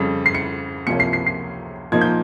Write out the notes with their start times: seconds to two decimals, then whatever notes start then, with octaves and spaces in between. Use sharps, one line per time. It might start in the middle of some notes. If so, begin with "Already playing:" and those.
Already playing: F2 C#3 G3
0.26 C7
0.35 C#7
0.87 C#2 C3 F3 A#3 C#4 C#7
1.00 C7
1.13 C7
1.26 C7
1.92 A#2 F3 A#3 D#4 G#6
2.01 G6